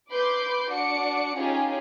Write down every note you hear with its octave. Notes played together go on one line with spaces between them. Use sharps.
B4 B5 C6 D6 G6
D4 F#4 D6 C#7
C#4 D#4 F4 G4 G#4